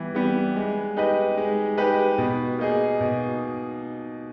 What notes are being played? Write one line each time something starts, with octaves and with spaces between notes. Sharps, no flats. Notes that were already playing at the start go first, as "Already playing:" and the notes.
Already playing: E3 G3 B3 G4
G3 B3 G4
G#3
D#4 G4 B4 D#5
G#3
D#4 G4 B4 D#5
B2
A#3 D#4 G#4
B2